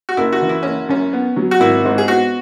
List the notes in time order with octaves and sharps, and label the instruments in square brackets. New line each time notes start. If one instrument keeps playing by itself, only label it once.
[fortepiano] F#4
[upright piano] F#1 [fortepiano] E4
[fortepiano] F#4
[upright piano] E3
[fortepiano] E4
[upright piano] F#1 [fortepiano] C#4
[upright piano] F#2 [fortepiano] C#4
[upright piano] B3
F#3
[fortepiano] F#4
[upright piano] G#1 [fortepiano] E4
[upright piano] G#2
[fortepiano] G#4
[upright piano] B3 [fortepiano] F#4